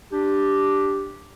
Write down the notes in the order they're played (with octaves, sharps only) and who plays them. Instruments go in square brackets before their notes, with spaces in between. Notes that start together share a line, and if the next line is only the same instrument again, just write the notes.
[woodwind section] D4 G4